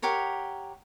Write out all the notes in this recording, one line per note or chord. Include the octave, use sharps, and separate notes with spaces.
G4 A#4 C#5 F#5